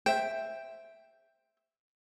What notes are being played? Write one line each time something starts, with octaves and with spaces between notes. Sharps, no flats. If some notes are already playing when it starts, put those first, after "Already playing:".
C5 E5 G5